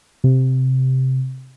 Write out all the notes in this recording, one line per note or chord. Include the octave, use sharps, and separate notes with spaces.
C3